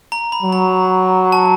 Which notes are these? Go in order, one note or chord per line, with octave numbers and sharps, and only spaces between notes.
A#5
B5
F#3
A#5
A5